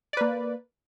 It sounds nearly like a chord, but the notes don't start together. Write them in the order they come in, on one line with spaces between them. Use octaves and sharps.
D5 B4 A#3